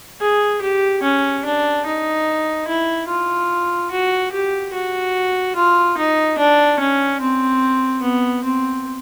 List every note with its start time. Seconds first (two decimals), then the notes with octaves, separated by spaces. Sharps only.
0.21 G#4
0.62 G4
1.03 C#4
1.45 D4
1.86 D#4
2.68 E4
3.09 F4
3.91 F#4
4.32 G4
4.73 F#4
5.56 F4
5.97 D#4
6.38 D4
6.80 C#4
7.21 C4
8.02 B3
8.44 C4